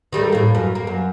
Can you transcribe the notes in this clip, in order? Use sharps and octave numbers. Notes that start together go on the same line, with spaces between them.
D#3 G3 A3
A2 A#3
F#2
A#3
F#2